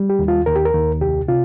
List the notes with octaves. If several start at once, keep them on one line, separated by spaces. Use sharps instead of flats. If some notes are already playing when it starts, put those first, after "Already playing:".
Already playing: G3
G4
D#2
F4
D#2 A#4
G4
A#4
D#2
C2 G4
C3 F4